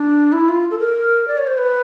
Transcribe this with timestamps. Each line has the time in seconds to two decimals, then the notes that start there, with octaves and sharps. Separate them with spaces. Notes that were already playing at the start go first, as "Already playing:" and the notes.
Already playing: D4
0.32 E4
0.49 F4
0.71 A4
0.79 A#4
1.28 D5
1.38 C#5
1.47 C5
1.58 B4